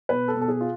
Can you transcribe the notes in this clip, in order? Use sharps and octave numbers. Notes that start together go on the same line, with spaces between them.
B2 B4
A4
B2
A4
G#4
F4